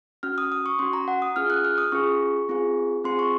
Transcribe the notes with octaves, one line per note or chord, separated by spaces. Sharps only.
C#4 F#4 F6
D#6
D#6
C#6
C#4 F#4 C6
A#5
F#5
D#6
C#4 F4 G#4 F6
F#6
F6
D#6
C#4 F4 G#4 C#6
C4 F4 G#4
C4 F4 G#4 C6
C#6